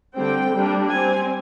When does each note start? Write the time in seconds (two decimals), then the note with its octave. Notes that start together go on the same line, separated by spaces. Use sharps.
0.15 D3 G3 C4 G5
0.54 G3 A#3 D4
0.91 G3 C4 G#5